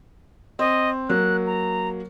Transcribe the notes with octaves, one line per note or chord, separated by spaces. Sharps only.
C4 D#5
F#3 A#3 F#6
A#5